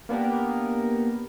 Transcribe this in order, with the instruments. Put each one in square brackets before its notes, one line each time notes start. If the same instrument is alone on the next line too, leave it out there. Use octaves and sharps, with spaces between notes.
[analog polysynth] A#3 B3 D4 G4 A#4